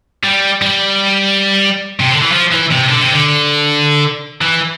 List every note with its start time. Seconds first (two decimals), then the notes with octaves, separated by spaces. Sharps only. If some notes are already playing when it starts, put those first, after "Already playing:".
0.24 G3
0.62 G3
2.00 C3
2.11 D3
2.22 E3
2.32 F3
2.51 E3
2.71 C3
2.89 D3
3.00 C3
3.12 D3
4.41 E3